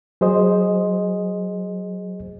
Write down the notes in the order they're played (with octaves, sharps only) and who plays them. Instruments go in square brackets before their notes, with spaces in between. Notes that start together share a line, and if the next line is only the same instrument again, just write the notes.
[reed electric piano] F#3 G#4 C5 D#5